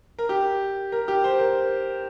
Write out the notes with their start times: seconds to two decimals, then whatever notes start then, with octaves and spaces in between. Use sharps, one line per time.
0.19 A#4
0.29 G4
0.92 A#4
1.08 G4
1.24 C5
1.40 A#4